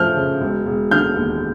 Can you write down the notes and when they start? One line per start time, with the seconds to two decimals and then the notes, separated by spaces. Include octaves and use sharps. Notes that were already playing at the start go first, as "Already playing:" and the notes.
Already playing: F3 A3 F6 G6
0.16 C#3
0.41 E1
0.66 E1
0.91 D3 F6 G6
1.16 D#2